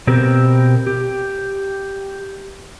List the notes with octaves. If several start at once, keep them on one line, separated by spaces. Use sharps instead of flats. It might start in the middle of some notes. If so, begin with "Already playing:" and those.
B2 B3 C4 G4 A#4
G4